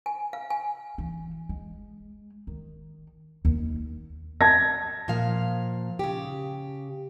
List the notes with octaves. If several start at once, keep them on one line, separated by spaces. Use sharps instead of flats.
G#5
F5
G#5
E3
G#3
D#3
D#2
A5 G#6 A#6
A#2 F3 F5
C#3 G4